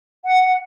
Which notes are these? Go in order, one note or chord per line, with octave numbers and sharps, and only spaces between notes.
F#5